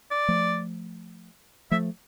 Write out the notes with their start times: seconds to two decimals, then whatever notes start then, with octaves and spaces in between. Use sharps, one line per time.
0.11 D5
0.28 F3 A3
1.71 F3 A3 E5